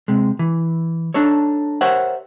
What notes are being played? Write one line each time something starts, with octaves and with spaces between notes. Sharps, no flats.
C3 G#3
E3
D4 D#4 A4 C#5
G4 A#4 C5 C#5 E5 F#5